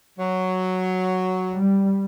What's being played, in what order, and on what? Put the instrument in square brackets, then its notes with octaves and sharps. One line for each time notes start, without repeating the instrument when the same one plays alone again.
[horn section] F#3
[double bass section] G3